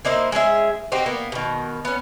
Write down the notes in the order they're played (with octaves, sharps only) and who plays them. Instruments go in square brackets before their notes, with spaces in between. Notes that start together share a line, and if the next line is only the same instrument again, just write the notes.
[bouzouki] A#3 D#4 E4 C5
G#3 C#4 G#4 E5
C4 D#4 F#4 G4
A#3 B3
B2 D#3
B3 C#4